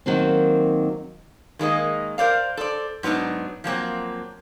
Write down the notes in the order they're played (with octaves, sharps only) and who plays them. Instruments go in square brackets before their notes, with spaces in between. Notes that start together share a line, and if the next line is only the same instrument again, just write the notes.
[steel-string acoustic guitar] D#3 F#3 A#3 C4
[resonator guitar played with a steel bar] D#3 G#3 A#3 D#5
A#4 C5 D5 F5
A4 C5 D5
G#2 F#3 B3 D4 D#4
F3 F#3 A#3 C4